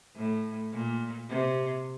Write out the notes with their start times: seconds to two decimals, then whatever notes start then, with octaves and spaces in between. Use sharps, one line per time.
0.16 A2
0.73 A#2
1.29 C3